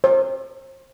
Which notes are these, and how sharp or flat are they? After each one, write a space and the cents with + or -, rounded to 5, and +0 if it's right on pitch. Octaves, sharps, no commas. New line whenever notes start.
C5 +35